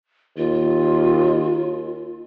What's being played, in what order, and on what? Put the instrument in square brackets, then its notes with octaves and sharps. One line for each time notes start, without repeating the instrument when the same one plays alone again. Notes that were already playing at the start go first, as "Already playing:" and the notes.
[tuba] D#2 [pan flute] F4